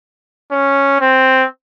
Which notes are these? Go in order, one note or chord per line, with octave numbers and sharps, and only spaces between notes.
C#4
C4